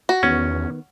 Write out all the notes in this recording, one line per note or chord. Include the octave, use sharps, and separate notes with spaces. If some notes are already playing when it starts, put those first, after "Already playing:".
F#4
E2 D#3 B3 C#4